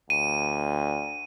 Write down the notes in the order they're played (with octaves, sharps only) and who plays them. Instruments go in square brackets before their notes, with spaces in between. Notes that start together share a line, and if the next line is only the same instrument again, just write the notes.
[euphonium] D2 [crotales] D#7